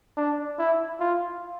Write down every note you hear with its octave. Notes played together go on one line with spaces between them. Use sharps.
D4
E4
F4